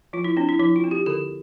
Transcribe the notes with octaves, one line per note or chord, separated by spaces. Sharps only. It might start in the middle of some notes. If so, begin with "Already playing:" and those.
F3 F4
E4
C4 D4
E4
F3 E4
F4
C4
G4
D3 A4